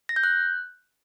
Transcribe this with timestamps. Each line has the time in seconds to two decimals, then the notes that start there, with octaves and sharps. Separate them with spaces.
0.09 A#6
0.16 G6
0.24 F#6